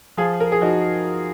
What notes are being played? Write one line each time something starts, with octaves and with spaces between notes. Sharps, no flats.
F3 F4 G#4
A#4
G#4
F3 D#4 F#4